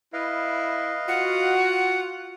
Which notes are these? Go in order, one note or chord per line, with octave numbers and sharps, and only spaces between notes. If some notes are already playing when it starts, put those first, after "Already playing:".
E4 B4 D#5 F5
F4 F#4 F#5